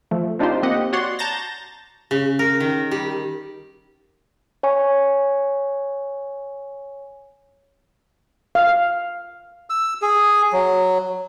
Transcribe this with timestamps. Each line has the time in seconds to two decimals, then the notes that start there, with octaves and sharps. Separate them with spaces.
0.11 F3 A3
0.39 C4 D4 D#4 F4 G4 C5
0.63 A#3 C4 G4 D#5 F#5
0.93 F#4 C#5 D5 F#5 C6
1.19 A5 A#5 G6 A6 A#6
2.11 C#3
2.39 A#4
2.60 D#3
2.91 G3
4.63 C#5 G#5 C#6
8.55 F5
9.70 E6
10.02 G#4
10.53 F#3